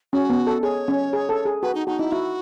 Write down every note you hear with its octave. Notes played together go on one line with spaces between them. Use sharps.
C#4 F#4
B3
A4
G#4 C#5
C#4
G#4
A4
G#4
F#4 B4
D#4
D#4 F#4
D#4 E4
E4 F#4